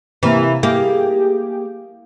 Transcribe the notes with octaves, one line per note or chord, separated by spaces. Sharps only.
C3 E3 A#3
A#3 G4 G#4